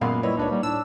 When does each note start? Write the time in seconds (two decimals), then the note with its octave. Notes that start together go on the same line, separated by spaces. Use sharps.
0.01 F#2 A#2 G#3 B3 F5
0.23 G3 E4 B4 C#5 D#5
0.37 C#2 D4 D#4 B4 C#5
0.51 G3 A#3
0.63 A2 D4 E6